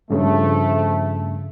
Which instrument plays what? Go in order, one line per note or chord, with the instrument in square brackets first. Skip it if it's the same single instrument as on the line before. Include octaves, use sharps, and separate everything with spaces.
[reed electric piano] G2 C#3 [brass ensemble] F3 A3